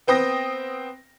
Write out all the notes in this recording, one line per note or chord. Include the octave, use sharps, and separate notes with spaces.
B3 C4 G5 D#6 A#6